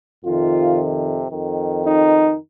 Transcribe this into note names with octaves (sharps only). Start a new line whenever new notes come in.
F2 C3 D#3 F4
F2 D#3
D#4